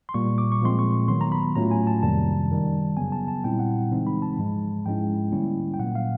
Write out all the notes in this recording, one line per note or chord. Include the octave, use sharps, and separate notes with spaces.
C6
A#2 G3 A#3 C#6
D6
C#6
A#2 F3 G#3 C4 C6
C#6
D#3 F#3 B3 C6
A#5
B5
A2 F#3 A3 C#4 F4 A#5
G#5
A5
F2 C3 D#3 G3 A#3 A5
F#2 D#3 G3
C#3 F#3 B3 G#5
A5
A5
A#2 G3 C4 E4 G5
F#5
C#3 E3 G#3 C4 D#4
B5
A5
G#2 F3 G#3
G#2 F3 G#3 C#4 E4 G5
D3 G3 A#3 C#4 E4
G5
A#2 F#3 A#3 F#5
F5